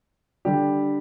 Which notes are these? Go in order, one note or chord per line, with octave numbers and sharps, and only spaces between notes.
D3 G3 D4 G4